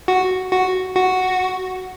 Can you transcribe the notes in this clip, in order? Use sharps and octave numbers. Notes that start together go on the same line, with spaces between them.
F#4
F#4
F#4